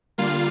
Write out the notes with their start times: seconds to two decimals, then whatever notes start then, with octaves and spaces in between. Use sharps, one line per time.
0.18 D3 G3 A#3 F4 F5